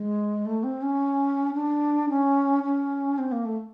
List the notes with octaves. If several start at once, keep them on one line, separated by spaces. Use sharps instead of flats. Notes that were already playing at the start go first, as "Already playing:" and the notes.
Already playing: G#3
A3
C4
C#4
D4
C#4
C#4
C4
A#3
A3